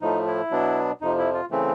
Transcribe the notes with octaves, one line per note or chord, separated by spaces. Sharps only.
A2 F3 A3 D#4
E4
B2 F#3 B3 D4
F2 C3 F3 D#4
E4
F4
C#3 E3 A3 C4